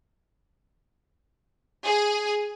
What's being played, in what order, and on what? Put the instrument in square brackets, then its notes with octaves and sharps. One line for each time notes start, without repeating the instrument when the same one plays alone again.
[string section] G#4